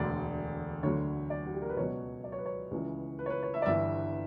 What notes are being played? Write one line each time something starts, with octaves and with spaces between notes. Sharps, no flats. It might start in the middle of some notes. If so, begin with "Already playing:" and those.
Already playing: E1 D2 D3 D5
D2 D3 F#3 C#5
D5
F#4
G4
A#4
B4
C#2 B2 F#3 C#5
D5
C#5
B4
C#5
C#2 C#3 E3
B4
C#5
B4
C#5
E5
D5
G1 G2 E3 E5